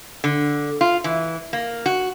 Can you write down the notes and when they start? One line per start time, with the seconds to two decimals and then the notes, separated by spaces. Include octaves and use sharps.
0.24 D3
0.81 F4
1.04 E3
1.53 A#3
1.86 F#4